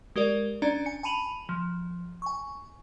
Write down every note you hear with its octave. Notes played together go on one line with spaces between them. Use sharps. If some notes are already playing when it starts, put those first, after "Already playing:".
G#3 G4 A#4 D5
C#4 D4 D5 A#5
G#5 C#7
G#5 A5 B5 D#7 F7 F#7
F3
G#5 C#6